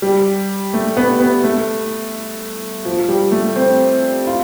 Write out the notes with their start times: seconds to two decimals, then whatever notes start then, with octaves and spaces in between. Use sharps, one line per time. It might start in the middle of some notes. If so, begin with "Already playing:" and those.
0.02 G3
0.74 A3
0.97 B3
1.20 B3
1.44 A3
2.85 F3
3.09 G3
3.32 A3
3.56 C4
4.27 F4